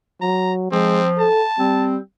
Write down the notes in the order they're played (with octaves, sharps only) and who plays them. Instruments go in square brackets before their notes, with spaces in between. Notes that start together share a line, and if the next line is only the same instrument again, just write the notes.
[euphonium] F#3 [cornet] A#5
[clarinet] F3 [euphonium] G#3 [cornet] C4
[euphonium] A4 [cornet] A5
[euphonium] G3 [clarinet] C4